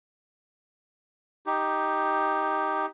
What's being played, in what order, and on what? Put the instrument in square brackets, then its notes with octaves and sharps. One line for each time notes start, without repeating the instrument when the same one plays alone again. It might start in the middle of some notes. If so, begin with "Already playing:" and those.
[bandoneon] D#4 G4